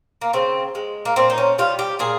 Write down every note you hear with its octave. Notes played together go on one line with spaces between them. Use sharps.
A#3
C#3 C4
G#3
A#3
A#2 C4
D#4
C#4
G3 F4
G4
A#2 G#4